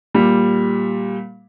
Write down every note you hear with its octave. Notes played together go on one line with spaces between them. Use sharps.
A#2 G3